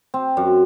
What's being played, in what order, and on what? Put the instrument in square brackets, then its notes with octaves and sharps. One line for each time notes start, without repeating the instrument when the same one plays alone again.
[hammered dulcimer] C4
F#2